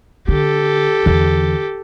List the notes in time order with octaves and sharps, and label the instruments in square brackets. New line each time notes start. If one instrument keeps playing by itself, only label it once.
[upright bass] D3 [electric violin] G4 A4
[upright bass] E2 D3